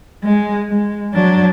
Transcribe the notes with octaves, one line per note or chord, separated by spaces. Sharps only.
G#3
G#3
F#3 D4